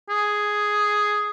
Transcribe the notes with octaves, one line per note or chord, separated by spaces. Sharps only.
G#4